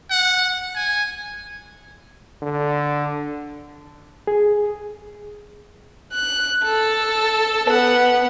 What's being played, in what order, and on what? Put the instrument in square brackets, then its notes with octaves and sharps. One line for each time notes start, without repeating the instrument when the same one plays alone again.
[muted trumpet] F#5
G#5
[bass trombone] D3
[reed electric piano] G#4
[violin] F#6
A4
B3 F#5